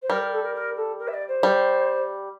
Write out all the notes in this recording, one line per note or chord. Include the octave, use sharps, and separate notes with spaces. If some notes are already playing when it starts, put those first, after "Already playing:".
C5
G3 A#4
A#4
A4
A#4
A#4
A4
A#4
E5
D5
C5
G3